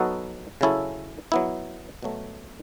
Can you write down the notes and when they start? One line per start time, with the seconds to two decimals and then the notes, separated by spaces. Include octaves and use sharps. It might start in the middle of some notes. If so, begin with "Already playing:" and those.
Already playing: F#3 B3 D#4 F#4 A4
0.61 C#3 F#3 C#4 E4 A4
1.32 F#3 B3 E4
2.03 B2 F#3 A3